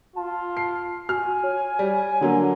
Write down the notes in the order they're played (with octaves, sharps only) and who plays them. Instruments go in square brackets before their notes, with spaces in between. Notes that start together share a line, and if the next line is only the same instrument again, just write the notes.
[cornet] F4 [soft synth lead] A5
[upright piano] C7
[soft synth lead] F#4 [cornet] G#5 [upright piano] F6
[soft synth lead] C#5
[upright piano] G3
[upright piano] D3 F#3 A#3 [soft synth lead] D4